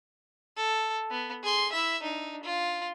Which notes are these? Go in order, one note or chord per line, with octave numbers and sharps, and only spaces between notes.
A4
B3
G#4 C6
E4 E5
D4 D#4
F4